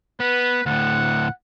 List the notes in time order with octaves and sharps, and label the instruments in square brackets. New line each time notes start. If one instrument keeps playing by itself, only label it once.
[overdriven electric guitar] B3 [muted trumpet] B4
[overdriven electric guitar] D2 A2 [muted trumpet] F#5